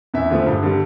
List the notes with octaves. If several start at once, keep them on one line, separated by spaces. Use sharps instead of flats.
E2 E5
D3 F3 A3
G2
D3 G3